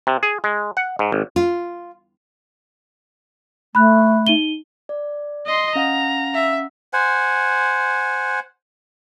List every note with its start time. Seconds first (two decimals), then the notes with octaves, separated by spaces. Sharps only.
0.07 C3
0.23 G#4
0.44 G#3
0.77 F#5
0.99 G#2
1.12 G#1
1.36 F4
3.75 A3 B5 F#6
4.27 D#4 D#7 G7
4.89 D5
5.46 D#5 C6
5.75 C#4 F5 F#5 A#5
6.34 E5
6.93 C5 F#5 G#5